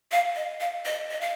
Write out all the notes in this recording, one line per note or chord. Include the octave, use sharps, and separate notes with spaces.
F5
D#5
F5
D#5
D#5
F5